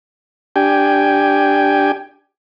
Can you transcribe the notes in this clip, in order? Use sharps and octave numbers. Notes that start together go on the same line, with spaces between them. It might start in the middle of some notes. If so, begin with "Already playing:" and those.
D4 G4 G5 G#5